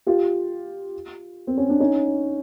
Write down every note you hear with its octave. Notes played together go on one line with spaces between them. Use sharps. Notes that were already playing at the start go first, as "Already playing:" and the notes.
F4 G4
C4
C#4
D4
C#4 D#4